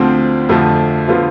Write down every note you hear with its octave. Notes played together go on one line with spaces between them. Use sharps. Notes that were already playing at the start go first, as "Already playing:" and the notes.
Already playing: D2 D3 F3 C4
F2 D3 F3 A3
D3 F3 B3 F4